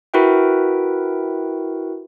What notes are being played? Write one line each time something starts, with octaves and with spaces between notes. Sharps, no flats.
E4 F#4 A#4 B4 E5 G5